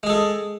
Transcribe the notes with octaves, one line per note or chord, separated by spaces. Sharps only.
G#3 G#4 A4